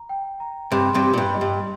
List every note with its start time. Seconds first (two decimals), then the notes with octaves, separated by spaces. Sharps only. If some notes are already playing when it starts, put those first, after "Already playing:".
Already playing: A#5
0.09 G5
0.40 A#5
0.71 G2 C3 C6
0.94 G2 C3
1.02 G4
1.13 A#2
1.18 G2
1.33 D#5
1.41 G2